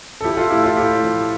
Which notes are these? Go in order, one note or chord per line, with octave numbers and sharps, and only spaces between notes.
A4
F3 E4 G4
F4 A4
A2 E4 G4
F4 A4
A2 E4 G4
F3